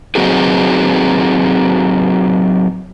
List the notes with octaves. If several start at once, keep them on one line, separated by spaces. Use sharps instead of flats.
F#3 C4 D#4 F#4 G#4